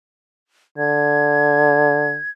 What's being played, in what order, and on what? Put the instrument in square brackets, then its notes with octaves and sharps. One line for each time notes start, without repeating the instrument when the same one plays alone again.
[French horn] D3 [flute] G#6